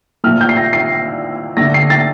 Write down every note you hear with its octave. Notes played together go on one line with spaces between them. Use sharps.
A#2 F3 A3 F6
G6
C7
A#6
C7
D3 A3 A#6
C7
A6